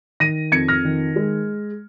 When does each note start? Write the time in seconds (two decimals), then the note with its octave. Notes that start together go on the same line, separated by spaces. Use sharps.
0.20 D#3 A#6 D#7
0.52 F2 G#6 C#7
0.68 F6 A#6
0.85 D#3
1.16 G#3